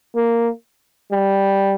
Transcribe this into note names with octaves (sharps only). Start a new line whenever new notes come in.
A#3
G3